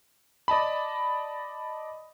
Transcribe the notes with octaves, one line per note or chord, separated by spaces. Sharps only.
D5 D#5 A5 B5